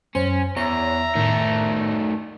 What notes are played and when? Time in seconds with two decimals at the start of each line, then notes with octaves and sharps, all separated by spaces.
0.15 F#2 C#4 C5
0.57 E2 C#5 E5 A#5
1.15 A2 D#3 A3